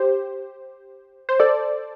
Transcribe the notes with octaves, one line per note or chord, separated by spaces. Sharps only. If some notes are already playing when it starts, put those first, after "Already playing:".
Already playing: G4 C5
C5
A4 D5